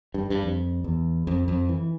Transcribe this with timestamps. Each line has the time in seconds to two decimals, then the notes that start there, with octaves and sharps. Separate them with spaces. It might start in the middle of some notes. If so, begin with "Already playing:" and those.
0.14 G2
0.30 G2
0.43 F2
0.84 E2
1.27 F2
1.48 F2
1.69 E3